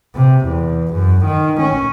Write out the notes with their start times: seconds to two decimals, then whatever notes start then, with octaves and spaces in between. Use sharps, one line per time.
0.15 C3
0.47 E2
0.94 F#2
1.26 D#3
1.60 C#4